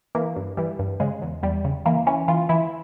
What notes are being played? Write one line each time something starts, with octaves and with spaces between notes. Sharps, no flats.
E3 A#3
G2
E3 G3
G2
C#3 G#3
E2
E2 G3
C#3
E3 A#3
E3 C#4
E3 F4
E3 E4